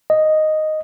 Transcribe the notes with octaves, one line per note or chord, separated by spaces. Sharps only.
D#5